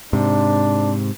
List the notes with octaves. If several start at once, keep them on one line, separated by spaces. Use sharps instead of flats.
G#2 C3 D4